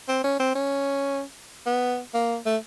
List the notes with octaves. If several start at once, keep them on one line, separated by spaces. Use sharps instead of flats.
C4
C#4
C4
C#4
B3
A#3
A3